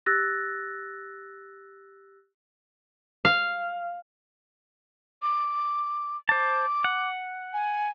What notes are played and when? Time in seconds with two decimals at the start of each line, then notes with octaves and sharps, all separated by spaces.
0.06 G4 E6 F#6 A6 A#6
3.25 F5
5.22 D6
6.29 C5 A5 D6
6.84 F#5
7.53 G#5